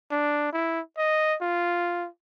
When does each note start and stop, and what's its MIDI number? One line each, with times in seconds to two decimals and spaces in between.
0.11 0.52 62
0.53 0.80 64
0.98 1.36 75
1.42 2.08 65